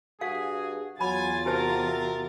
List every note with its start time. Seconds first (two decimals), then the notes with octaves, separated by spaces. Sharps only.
0.21 G2 F#4 G#4 F5
1.01 E2 F#3 F4 G#5 B5 A6
1.46 C3 F#4 G4 A#4 C5 A5